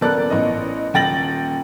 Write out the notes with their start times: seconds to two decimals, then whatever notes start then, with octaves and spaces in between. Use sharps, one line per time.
0.01 D#1 B3 A4 A#4 D5 F#6
0.30 A1 D#5
0.94 D#1 G5 A6 A#6 F#7